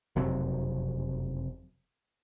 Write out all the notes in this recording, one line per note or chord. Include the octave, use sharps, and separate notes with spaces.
F#1 F2 C3 F#3